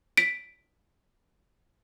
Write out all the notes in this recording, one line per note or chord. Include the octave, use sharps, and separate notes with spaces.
B6 D7